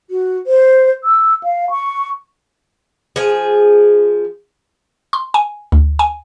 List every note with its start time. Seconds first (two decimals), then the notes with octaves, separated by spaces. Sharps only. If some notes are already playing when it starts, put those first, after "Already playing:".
0.10 F#4
0.47 C5
1.04 E6
1.43 F5
1.70 C#6
3.16 F3 G#4
5.13 C6
5.34 G#5
5.72 D2
5.99 G#5